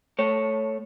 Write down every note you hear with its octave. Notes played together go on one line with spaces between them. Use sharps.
A3 C#5